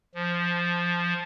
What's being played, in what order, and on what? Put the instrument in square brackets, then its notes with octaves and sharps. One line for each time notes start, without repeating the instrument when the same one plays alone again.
[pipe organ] F3